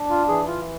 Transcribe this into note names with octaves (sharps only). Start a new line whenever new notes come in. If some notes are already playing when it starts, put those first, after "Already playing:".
Already playing: D4
F4
E3 G#4
F4